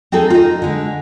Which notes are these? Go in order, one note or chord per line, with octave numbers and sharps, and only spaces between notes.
C4 D#4 G#4 A4
D#4 F4
D3 G#3